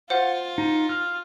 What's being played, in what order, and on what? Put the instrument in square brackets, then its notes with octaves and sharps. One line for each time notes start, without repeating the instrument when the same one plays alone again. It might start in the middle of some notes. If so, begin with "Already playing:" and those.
[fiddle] F4 [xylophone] C5 F#5
[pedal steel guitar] D#4
F6